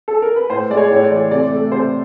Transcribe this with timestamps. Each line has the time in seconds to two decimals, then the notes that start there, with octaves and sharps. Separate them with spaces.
0.08 A4
0.22 A#4
0.36 B4
0.50 A2 C5
0.70 G#3 D5
0.77 C#5
0.91 A2 C#5
1.04 D5
1.11 E3
1.31 C3 D5
1.51 A3
1.72 C3 C5